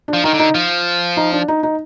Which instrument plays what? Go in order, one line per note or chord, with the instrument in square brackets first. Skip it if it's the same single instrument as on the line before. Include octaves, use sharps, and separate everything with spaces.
[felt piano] D4
[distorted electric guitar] F3
[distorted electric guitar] D#3 [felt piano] D#4
[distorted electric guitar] D3
[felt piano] D#4
[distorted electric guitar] F3
[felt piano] D#4
D4
D#4
D#4